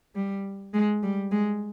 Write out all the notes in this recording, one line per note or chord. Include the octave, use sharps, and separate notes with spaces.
G3
G#3
G3
G#3